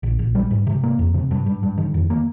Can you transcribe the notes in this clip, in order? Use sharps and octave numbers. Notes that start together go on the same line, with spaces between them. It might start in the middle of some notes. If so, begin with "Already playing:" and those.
A#1
A#1
G3
G#2
C3
A#3
F2
C3
G2
G2
G2
D#3
F2
A#3